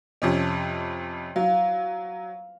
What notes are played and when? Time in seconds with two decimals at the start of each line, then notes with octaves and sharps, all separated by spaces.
0.22 F2 C3 C#4
1.36 F#3 F5